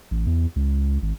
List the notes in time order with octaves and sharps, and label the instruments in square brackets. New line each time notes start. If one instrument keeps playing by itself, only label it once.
[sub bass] A1
E2
C#2
G#1